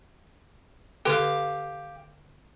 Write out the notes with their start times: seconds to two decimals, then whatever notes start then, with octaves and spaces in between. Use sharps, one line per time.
1.05 D3 G4 A4 F5